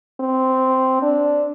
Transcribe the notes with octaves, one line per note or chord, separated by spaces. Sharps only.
C4
D4